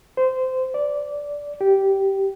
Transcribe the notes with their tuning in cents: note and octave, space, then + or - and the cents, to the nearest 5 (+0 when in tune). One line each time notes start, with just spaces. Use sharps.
C5 -20
D5 -10
G4 -10